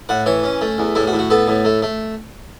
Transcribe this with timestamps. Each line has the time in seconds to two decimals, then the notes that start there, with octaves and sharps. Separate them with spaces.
0.09 A2 F#5
0.26 E3 C#5
0.44 C#4
0.61 A3
0.78 E2
0.95 A2 E4
1.07 F#4
1.13 A2
1.19 F#4
1.30 B3 A4
1.48 A2
1.65 A3
1.83 A3